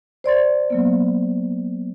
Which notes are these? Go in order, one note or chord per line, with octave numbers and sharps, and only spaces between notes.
C5 D5 C6 A6
F#3 A#3 B3